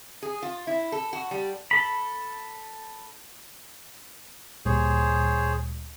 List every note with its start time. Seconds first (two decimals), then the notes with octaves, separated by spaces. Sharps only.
0.23 G#4
0.43 F4
0.67 E4
0.92 A4
1.13 F#4
1.31 G3
1.71 A4 B5
4.65 D2 A#2 G3 G#4 C5 C#5